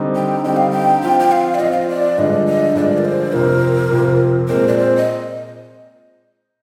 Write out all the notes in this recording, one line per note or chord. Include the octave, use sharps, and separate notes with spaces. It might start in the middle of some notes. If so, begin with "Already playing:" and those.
Already playing: D3 G3 C4 D#4
G5
D3 G3 C4 D#4 G5
F5
G5
F3 C4 F4 G5
G5
F5
D5
F3 C4 F4 D#5
F5
D#5
D5
G2 D3 F3 G#3 D4 D#5
D#5
G2 D3 F3 G#3 D4 D5
A#4
C5
F2 C3 F3 C4 A#4
F2 C3 F3 C4
A#2 G#3 C4 A#4
D5
C5
D#5